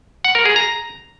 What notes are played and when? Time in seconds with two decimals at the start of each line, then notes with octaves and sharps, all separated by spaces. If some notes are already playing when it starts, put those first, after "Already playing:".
0.25 F#5
0.35 A#4
0.45 G#4
0.56 A#5